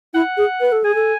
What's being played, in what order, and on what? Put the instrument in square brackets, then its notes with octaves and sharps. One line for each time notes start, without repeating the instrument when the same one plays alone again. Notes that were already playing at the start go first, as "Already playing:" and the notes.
[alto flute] E4 [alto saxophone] F#5
[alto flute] G#4
B4
A4
[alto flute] G#4 [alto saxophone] G#5
[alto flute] A4